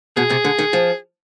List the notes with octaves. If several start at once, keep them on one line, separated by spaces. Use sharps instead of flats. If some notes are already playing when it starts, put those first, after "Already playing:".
B2 G#4
C3
D3
D#3
F3